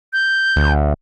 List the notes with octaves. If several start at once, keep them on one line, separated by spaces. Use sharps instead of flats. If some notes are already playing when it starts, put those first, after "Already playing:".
G6
D2